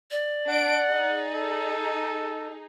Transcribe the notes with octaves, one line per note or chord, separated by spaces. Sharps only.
D5
D4 F#5 D7
D#4 G#4
A4